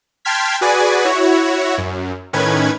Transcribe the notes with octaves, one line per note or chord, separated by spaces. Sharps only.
G5 A5 C6 F6 G#6 B6
F#4 G#4 B4 D5 G#5
E4 F#4 C#5
F#2
A2 D#3 C#4 B4 G#6